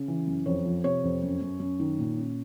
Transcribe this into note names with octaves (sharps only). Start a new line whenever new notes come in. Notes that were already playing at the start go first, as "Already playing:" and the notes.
Already playing: C#3
E3
F#2
F2 C#5
F3
C3 C#5
F2
F#2
F#2
F#2
D#3
A#2
C#4